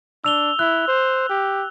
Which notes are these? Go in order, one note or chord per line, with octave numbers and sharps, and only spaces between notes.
D4 E6 F7 G7
E4 F#6
C5
G4